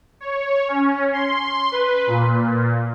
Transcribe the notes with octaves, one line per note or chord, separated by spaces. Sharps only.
C#5
C#4
C6
B4
A#2